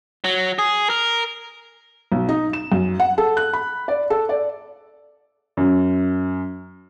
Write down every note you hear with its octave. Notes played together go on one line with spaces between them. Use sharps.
F#3
G#4
A#4
B1
D#4
E7
F#2
F#5
A4
F#6
B5
D5
A4
D5
F#2